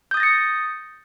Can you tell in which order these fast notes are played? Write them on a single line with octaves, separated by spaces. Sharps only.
G6 D#6 A6 A#6 C#7